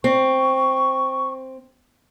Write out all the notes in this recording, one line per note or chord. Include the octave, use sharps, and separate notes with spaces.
C4 C#6